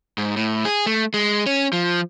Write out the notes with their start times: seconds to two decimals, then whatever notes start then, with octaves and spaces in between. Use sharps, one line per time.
0.18 G#2
0.36 A2
0.65 G#4
0.86 A3
1.14 G#3
1.47 C#4
1.73 F3